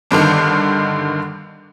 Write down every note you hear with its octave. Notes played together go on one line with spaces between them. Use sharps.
G1 G2 D3 D#3